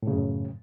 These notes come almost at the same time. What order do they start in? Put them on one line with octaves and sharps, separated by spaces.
A2 C#3 F#2